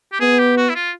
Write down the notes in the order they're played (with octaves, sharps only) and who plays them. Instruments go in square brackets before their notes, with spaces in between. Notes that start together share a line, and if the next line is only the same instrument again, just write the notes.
[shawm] G4
[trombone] B3 [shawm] G#4
[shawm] G4
F#4
E4
F4